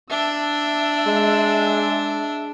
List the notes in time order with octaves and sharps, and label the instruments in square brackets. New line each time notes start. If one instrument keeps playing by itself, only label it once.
[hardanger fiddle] D4 [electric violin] E5 E6
[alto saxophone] G#3